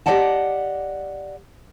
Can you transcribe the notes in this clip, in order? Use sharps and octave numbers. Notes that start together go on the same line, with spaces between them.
G4 G#4 D5 D#5 F#5 A5